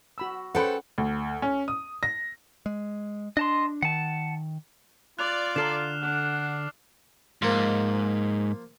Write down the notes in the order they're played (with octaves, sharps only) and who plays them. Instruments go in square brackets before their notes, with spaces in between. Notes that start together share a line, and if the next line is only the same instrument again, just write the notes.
[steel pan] F#4 B5 E6
[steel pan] C#4 G#4 F#5 [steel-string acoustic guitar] A4 G5 [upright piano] B4 C5 B5
[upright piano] D2
C#4
D#6
A#6
[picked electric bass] G#3
[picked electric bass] D4 [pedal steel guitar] D#5 A5 C6
[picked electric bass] D#3 [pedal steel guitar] F#5 A5
[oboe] F4 [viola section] D5 [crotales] F#6 F7
[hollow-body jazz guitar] D3 A4 A#5 [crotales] F6 C7 E7
[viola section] D4 [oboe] F#5
[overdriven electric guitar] G#2 [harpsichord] F3 A#3